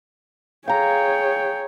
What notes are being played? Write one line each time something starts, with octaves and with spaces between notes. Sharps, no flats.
G#4 C#5 F5 G5 A#5